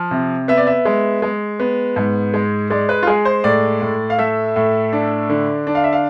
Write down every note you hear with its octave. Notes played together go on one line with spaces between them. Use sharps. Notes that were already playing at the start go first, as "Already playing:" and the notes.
Already playing: F3
C3
B3 E5
D5
E5
G#3
G#3
B3
G#2
G#3
G#3 D5
B4
F4
G#3 G#4
C5
A2 D5
A2
F5
A3 E5
A2
D4
D3
D4
F5
E5
F5